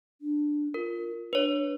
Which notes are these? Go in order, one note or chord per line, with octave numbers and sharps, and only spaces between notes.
D4
F4 A#4
D4 B4 C#5